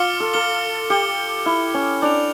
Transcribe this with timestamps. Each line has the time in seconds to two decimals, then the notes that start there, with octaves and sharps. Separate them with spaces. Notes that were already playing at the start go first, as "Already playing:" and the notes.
Already playing: F4 D6 F6 C#7 G7
0.20 A4
0.34 A4 D6 F6 C#7 G7
0.90 G4 F6 C#7 G7
1.45 E4 F6 C#7 G7
1.74 C#4
2.01 D4 G6 D7 F7